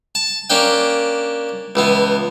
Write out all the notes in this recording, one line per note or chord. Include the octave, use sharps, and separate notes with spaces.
A5
A#3 C#4 D4 G5
C#2 E3 B3